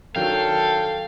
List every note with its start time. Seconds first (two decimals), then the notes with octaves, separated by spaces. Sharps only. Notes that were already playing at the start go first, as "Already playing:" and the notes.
0.16 D#3 F#3 D4 A4 F5 G5